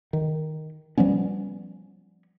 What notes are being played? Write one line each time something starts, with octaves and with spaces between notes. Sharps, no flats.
D#3
F3 G3 B3 C#4